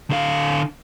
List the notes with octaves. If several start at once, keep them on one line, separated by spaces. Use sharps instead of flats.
D3 F5